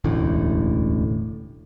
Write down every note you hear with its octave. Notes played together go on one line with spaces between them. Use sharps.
E1 A1 D2 A2